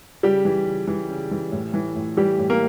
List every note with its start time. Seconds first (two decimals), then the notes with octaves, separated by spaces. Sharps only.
0.23 C#3 G3 G4
0.45 E3
0.67 C#3
0.87 E3
1.10 C#3
1.31 E3
1.52 A2
1.74 E3
1.96 A2
2.17 E3 G3 G4
2.38 A2
2.50 A#3 A#4